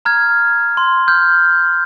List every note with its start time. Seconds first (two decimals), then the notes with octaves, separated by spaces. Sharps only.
0.05 A#5 F6 G#6
0.77 C6
1.08 F6 G6